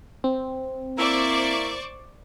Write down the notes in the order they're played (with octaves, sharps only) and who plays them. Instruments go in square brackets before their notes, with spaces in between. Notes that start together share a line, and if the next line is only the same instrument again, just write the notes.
[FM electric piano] C4
[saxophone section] A#3 E4 [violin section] C5 D5 C#6